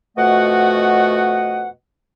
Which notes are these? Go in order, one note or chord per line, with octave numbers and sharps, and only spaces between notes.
F2 B2 A3 F#4 D#5 F#5